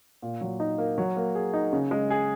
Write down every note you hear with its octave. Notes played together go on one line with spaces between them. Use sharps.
A#2
F#3
D#4
A#3
F#3
A#3
G#4
D#4
C#3
G#3
G#4